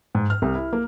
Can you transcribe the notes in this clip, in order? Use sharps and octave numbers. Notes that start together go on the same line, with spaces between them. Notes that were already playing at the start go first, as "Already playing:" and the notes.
G#2
F6
C2
E4
A#3